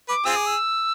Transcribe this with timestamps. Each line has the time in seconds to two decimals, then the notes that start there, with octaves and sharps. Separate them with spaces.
0.08 B4 D6
0.25 C4 F4 G#4 E6
0.36 D6
0.46 E6